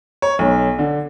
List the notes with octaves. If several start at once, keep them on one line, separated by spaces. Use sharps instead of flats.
C#5
B1
D3